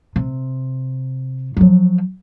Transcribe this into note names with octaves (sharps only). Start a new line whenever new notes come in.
C3
F3 F#3